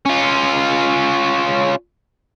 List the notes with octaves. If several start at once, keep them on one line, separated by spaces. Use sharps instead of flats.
C#4 F4